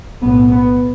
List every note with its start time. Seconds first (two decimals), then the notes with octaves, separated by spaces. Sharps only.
0.21 B1 A2 B3
0.50 B3